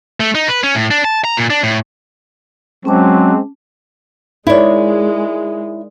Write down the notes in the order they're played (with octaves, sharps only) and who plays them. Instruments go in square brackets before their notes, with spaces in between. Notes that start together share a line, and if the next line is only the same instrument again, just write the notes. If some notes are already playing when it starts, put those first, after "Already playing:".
[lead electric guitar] A3
D#4
B4
C#4
A2
D4
A5
A#5
A#2
D4
A2
[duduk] F#3 [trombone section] G#3 C4 [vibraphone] C#4 A5 D6
[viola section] G#3 [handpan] D#4 A#4 D5 [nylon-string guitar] E4 C#5